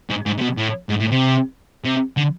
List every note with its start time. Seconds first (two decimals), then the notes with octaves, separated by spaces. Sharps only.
0.10 G#2
0.26 G#2
0.38 C3
0.41 B2
0.57 A2
0.89 G#2
1.00 A2
1.11 C3
1.85 C3
2.17 D3